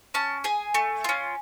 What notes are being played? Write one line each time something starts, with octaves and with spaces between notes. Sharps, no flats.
C#4 A5
G#4 G#5
A3
C#4 F4